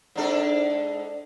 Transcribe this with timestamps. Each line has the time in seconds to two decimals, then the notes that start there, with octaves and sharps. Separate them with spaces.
0.16 G#2 D4 A4